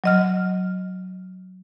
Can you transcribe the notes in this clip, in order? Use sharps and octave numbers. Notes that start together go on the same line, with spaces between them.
F#3 D#5 F6